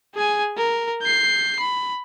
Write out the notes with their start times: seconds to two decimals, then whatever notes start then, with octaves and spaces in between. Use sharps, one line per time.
0.14 G#4 G#5
0.57 A#4
1.02 G6 C7
1.60 B5